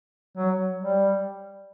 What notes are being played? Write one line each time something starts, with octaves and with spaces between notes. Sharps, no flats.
F#3
G3